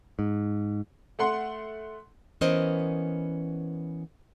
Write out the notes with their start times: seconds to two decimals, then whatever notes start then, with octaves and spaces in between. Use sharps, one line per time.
0.19 G#2
1.19 A3 F#5 C6
2.41 E3 B3 C#4 A#4 C5 D#5